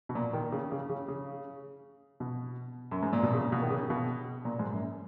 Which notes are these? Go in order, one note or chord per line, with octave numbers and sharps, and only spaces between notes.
B2
A#2
D#3
C#3
C#3
C#3
C#3
B2
F#2
G#2
A#2
B2
C#3
B2
D#3
C#3
B2
A#2
G#2
F#2